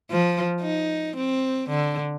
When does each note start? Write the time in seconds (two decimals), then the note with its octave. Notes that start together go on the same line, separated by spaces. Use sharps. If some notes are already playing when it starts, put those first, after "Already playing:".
0.11 F3
0.61 D#4
1.17 C4
1.70 D3